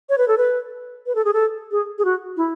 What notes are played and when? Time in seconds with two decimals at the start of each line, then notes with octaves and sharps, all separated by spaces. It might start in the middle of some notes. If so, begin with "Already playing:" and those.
0.09 C#5
0.18 B4
0.28 A4
0.38 B4
1.06 B4
1.15 A4
1.25 G#4
1.33 A4
1.72 G#4
1.98 G#4
2.05 F#4
2.37 E4